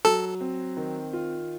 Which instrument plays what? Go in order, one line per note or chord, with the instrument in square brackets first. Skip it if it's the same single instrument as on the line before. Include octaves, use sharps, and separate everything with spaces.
[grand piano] F#3 [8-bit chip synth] A4
[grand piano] C4
D#3
F4